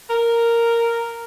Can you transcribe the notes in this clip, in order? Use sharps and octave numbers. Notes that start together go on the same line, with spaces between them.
A#4